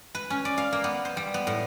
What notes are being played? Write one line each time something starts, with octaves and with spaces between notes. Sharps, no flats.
B4
C#4
D5
F5
A#3
B3
C5
G3
B3
A2